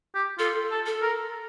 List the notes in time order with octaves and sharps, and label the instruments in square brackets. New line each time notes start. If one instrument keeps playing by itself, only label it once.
[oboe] G4
[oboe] F4 [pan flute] A4
[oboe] A4
[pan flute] A4
[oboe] A#4